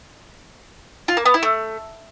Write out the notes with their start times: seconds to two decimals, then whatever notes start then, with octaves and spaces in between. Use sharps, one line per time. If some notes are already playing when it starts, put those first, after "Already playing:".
1.08 F4
1.17 A#3
1.25 B3
1.34 E4
1.43 A3